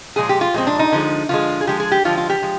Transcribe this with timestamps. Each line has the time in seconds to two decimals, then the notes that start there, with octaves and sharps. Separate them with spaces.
0.16 A#2 F3 G#3 G#4
0.29 G4
0.41 F4
0.54 A#2 F3 G#3 C4
0.67 D4
0.79 D#4
0.92 D3 F3 G#3
1.29 D3 F3 G#3 F4
1.61 G#4
1.67 D3 F3 G#3 G4
1.80 G#4
1.92 G4
2.05 D3 F3 G#3 F4
2.17 F4
2.30 G4
2.42 F3 G#3